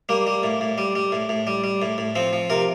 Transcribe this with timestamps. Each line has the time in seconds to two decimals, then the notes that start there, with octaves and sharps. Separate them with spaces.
0.09 G3 A#3
0.27 G3
0.43 A2
0.61 A2
0.78 G3
0.95 G3
1.12 A2
1.29 A2
1.47 G3
1.64 G3
1.82 A2
1.98 A2
2.16 F3 C4
2.33 F3
2.50 C3 A#4